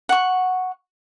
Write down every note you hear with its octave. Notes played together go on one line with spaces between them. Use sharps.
F#5 C#6